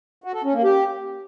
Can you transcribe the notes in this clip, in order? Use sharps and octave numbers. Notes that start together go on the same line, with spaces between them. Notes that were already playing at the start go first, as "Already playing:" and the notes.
F#4
A4
C#4
A#3
G4